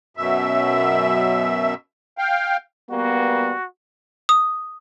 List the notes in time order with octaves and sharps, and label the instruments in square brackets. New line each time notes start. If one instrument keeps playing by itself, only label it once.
[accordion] F#2 B2 E5
F5 G5
[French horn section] G3 A#3 B3 [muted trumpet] F#4
[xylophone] D#6